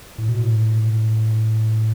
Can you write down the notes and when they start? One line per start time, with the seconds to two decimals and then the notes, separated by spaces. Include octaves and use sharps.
0.18 A2
0.28 B2
0.39 A2